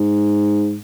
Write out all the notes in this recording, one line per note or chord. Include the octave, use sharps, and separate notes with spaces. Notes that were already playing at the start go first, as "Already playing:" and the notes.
Already playing: G#2